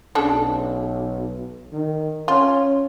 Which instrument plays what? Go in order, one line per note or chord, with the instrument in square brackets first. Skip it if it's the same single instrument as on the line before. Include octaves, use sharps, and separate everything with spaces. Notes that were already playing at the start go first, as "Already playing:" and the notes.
[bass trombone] B1 [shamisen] C#3 D4 A4
[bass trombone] D#3
[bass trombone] C#4 [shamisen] F4